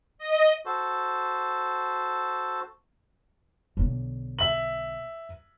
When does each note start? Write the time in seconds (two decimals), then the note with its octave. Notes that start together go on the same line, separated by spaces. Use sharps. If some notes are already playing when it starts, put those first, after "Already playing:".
0.18 D#5
0.65 F#4 A4 C5
3.77 B1 D3
4.39 E5 F#7